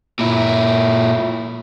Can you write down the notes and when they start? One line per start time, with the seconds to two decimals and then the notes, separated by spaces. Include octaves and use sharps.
0.19 A#2 E4